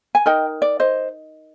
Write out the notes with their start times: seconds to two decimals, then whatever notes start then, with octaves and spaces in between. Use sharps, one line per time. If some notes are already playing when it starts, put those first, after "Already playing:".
0.15 G#5
0.26 D#4 A#4 D#5 G5
0.62 D5
0.80 C5 D#5